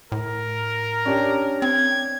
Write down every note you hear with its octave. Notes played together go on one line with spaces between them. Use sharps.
A2 A#4
C#4 D4 G4
C4 G#6